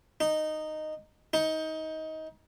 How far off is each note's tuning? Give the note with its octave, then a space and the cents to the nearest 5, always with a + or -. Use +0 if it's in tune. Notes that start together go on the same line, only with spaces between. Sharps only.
D#4 -10
D#4 +20